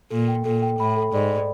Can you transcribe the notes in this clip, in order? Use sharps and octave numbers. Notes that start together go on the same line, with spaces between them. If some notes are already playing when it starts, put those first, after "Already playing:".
A#2 A4
G5
A#2 A4
G5
A2 B5
A4
G#2 D5
D5